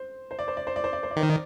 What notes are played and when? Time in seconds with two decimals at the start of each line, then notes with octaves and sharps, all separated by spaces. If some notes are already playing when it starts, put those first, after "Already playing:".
Already playing: C5
0.31 C5
0.39 D5
0.48 C5
0.57 D5
0.67 C5
0.76 D5
0.84 C5
0.93 D5
1.03 C5
1.11 D5
1.16 D#3 C5
1.30 D5